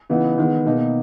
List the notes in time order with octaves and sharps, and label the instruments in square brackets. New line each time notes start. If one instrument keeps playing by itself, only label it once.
[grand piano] C#3 E3 B3 D#4
D#3 G#3 B3
B2 A#3 D#4